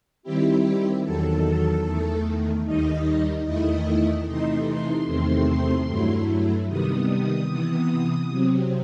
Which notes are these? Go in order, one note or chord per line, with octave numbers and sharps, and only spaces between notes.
D#3 G3 C4 E4 G4
E2 D#3 F#3 A4
E2 D#3 A3
D#2 D#3 G3 D#4 D#5
E2 D#3 A3 E4 D#5
C3 E3 A3 D#4 C6
C6
E2 C3 D#3 A3 C4
G2 F#3 A3 E4
C3 D#3 G3 B3 D#6
C3 E3 B3
C3 F#3 C4